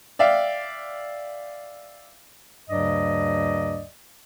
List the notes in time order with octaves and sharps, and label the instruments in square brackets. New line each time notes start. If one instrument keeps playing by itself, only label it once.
[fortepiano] D5 E5 F5 G5
[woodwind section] D2 G2 C#3 F#3 D5 D#5